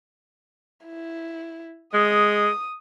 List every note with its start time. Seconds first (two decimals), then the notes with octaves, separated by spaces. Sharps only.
0.85 E4
1.94 G#3 D#6